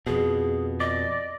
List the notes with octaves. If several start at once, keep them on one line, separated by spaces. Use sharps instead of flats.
F2 B2 G#4
D5 D#5